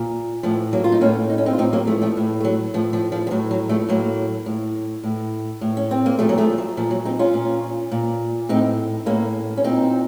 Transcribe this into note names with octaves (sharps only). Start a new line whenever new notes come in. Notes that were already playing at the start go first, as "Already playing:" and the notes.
Already playing: A#2
A2 F3
F#3 A#3
F4
D#4
A2 A#3 C#4
D#4
C#4
C4 D#4
F4
A2 C4 D#4
F#3 A#3
F3 A3
F3 A3
A2
A3
F#3
A2 F3
F3
F3
F3
A2 F#3
F#3
F3 A3
A2 F#3 A#3
A2
A2
A2
C#4
C4
A#3
A#2 F3 A3
F#3
F3 A3
F#3
A#2 F3
F#3
C4 D#4
C#4 F4
A#2
A#2
A2 C4 D#4
A2 A#3 C#4
C#4
A#2 C4 D#4